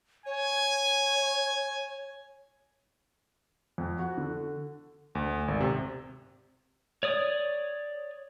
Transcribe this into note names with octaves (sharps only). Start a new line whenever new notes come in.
C#5 G#5
F2
F#4
D3
D2
G#1
C3
C#5 D5 D#6